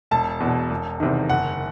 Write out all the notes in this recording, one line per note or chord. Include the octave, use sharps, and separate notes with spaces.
E1 A5
E2
B2
E1
E2 C3 D#3
F#1 F#5